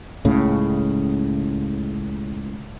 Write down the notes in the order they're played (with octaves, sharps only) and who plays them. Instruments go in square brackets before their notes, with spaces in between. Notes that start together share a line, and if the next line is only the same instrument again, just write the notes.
[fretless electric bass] C#2 A2 C#3